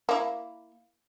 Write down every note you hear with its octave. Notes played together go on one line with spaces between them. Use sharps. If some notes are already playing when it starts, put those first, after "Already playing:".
A#3 E4